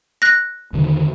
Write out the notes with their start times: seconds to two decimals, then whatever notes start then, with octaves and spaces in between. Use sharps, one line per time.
0.22 F#6 A#6
0.73 E2 D3 D#3